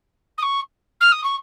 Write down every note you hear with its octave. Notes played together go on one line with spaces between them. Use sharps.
D#6
C#6
F6
D#6
C#6